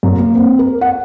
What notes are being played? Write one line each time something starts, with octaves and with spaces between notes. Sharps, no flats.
F#2
A#3
C4
A#4
F#5